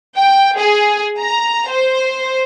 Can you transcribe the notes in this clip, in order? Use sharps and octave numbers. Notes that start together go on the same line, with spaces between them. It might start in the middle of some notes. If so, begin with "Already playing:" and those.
G5
G#4
A#5
C5